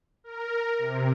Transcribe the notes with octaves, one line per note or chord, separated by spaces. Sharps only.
A#4
C3